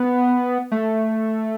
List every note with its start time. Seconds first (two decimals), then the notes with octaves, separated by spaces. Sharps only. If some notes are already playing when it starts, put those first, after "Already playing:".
Already playing: B3
0.71 A3